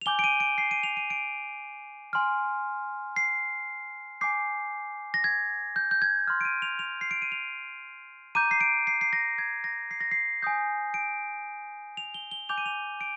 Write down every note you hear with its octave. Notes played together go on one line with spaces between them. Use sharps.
F7
G#5 D6 G6 G7
D7
D#7
D7
C7
D#7
F7
D#7
D7
G#5 C6 F6
C7
G#5 D6 G6 C7
A#6
G#6
G6
G6
G#6
C6 F6
D7
D#7
F7
F7
C7
D7
D#7
F7
A#5 D6 G6 D#7
C7
D7
C7
C7
A#6
G#6
A#6
C7
A#6
C7
G#5 D#6 G6
D7
F7
G7
G7
G#5 D6 G6 F7
D#7
F7
D7